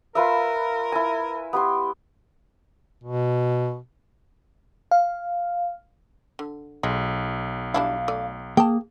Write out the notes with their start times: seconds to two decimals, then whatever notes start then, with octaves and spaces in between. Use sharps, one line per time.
0.15 F4 A#4 B4 E5
0.92 E4 G#5
1.53 B3 G4 C6
3.04 B2
4.91 F5
6.39 D3
6.83 B1 G#3
7.74 G3 D4 E4 F5
8.08 A3 D5
8.57 A#3 G#4 G5 A5